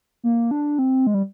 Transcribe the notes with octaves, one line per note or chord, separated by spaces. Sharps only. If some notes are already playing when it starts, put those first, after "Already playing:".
A#3
D4
C4
G#3
G3